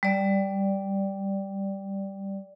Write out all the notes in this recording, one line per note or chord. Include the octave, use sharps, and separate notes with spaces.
G3 D5